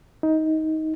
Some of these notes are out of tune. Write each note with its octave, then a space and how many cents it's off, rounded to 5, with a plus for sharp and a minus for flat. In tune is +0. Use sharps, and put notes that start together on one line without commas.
D#4 +15